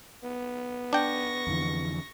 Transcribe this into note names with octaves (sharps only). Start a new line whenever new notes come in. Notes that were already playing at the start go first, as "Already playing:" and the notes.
B3
D4 G5 C#6 A#6
F2 D3 E3